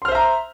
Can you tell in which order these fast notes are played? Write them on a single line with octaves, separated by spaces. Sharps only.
C6 F6 C5 E5 A#5